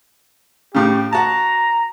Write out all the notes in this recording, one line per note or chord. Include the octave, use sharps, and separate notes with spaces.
A2 C#3 G4
F#4 A5 A#5